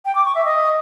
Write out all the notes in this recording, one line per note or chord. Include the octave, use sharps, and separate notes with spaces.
G5
D6
C#6
E5
D#5